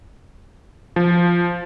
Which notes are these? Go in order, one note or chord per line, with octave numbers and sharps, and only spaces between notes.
F3